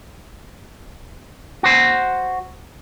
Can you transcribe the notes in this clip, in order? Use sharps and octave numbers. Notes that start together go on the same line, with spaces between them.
F#4 C5